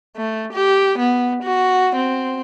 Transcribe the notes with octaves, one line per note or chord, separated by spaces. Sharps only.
A3
G4
B3
F#4
C4